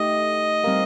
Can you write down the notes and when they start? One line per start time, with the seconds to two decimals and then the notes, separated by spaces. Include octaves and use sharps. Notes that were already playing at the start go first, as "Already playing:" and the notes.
Already playing: A3 D#4 G4 D#5
0.64 G3 C4 G4 A#4 F5